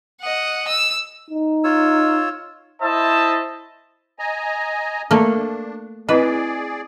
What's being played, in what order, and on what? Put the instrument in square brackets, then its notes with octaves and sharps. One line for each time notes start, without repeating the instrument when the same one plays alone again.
[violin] D#5 F#5
E6
[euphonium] D#4
[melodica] F4 C#5 E6
[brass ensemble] E4 C5 D#5 E5 A5
[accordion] D#5 G#5 A#5
[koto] A3 A#3 [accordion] D4
[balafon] C4 E4 D#5 [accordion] G#4 D5 [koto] B4